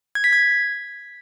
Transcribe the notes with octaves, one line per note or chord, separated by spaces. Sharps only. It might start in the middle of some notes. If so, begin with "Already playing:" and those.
G#6
B6
G#6